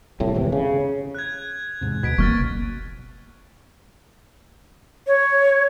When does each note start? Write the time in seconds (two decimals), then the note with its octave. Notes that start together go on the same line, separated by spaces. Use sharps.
0.20 C2 F2 A2
0.35 G#1 E2 C3 E3
0.52 C#3
1.15 F#6 G#6
1.81 E2 G#2 C3
2.03 D2 B2 G#6 B6 D7
2.18 F#1 B2 A#3 C#6 F6 A6
5.07 C#5